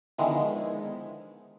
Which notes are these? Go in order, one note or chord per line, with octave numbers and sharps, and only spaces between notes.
D3 D#3 F3 G#3 B3 E4